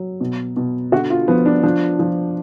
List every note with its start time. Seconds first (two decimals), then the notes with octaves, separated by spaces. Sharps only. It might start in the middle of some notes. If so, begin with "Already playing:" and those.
Already playing: F#3
0.21 B2
0.57 B2
0.92 D3 F#4
1.10 F4
1.28 F3 B3
1.46 D4
1.63 F3 D4
1.99 F3